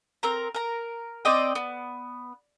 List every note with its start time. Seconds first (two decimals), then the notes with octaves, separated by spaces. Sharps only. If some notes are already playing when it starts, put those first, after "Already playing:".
0.23 C4 A#4 A#5
0.55 A#4 A#5
1.25 C4 D5 D#5 G5
1.55 B3